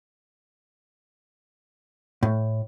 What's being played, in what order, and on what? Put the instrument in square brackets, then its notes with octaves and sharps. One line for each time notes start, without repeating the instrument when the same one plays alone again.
[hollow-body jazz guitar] A2